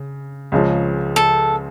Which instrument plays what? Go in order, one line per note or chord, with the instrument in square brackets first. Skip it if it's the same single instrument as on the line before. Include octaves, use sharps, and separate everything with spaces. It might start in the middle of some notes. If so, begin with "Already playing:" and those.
Already playing: [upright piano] C#3
C#2 C#3 F3
[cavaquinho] A4